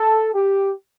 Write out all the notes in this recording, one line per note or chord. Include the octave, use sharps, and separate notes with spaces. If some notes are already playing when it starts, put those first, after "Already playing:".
Already playing: A4
G4